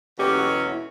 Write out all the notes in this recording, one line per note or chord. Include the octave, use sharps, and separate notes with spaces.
E2 B2 F#3 C#4 G4
F#4
E4